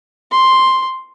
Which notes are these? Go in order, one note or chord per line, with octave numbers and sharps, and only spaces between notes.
C6